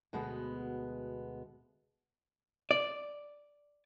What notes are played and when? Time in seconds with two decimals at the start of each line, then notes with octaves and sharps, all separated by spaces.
0.13 D2 B2 G#3 B3
2.71 D5